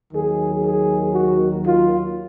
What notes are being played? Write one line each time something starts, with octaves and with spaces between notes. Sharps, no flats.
D#2 D#3 F#3 G#4
G#4
F#4
F4